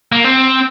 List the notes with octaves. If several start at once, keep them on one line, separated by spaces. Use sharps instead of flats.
A#3
C4